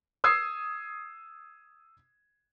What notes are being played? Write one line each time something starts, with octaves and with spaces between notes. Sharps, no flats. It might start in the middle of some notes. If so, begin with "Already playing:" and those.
D#6 E6 G#6 C7